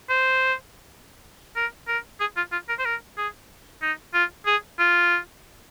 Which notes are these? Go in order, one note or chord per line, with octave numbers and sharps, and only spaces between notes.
C5
A#4
A#4
G#4
F4
F4
A#4
C5
A#4
G#4
D#4
F4
G#4
F4